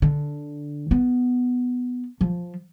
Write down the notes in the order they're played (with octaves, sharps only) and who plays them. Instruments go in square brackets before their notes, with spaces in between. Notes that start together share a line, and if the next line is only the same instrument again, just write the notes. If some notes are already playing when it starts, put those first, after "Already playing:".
[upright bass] D3
B3
F3